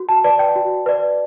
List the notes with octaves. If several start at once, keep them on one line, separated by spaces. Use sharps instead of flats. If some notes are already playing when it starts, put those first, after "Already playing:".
Already playing: F#4
A5
B4 D5 A5
G5
F#4
B4 D5